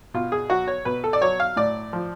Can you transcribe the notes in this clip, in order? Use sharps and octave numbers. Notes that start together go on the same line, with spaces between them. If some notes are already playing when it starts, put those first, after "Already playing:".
B2 F4
G#4
F#3 F#4
C#5
B2 B4
A4
D5
F#3 C#5
F5
A2 D5
F3